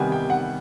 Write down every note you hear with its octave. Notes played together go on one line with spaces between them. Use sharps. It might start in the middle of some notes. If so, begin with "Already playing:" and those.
Already playing: C3 D#3 G3 B3 G5 G#5
G5
F#5